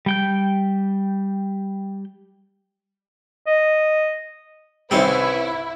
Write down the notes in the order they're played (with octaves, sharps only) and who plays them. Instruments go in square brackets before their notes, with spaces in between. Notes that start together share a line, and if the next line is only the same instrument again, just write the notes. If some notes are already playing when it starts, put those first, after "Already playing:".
[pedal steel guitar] G3 G5 G6
[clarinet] D#5
[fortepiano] C2 D#3 G3 [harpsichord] C4 C#4 [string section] E4 [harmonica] B4 E5